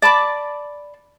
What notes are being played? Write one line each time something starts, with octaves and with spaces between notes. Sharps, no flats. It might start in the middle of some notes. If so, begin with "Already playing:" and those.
D5 A5 B5 D6